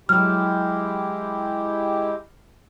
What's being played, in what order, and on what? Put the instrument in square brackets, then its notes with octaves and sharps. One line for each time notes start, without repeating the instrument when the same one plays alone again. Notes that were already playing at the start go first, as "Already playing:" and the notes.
[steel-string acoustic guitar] F#3 [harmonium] G#3 E4 G4 [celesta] F6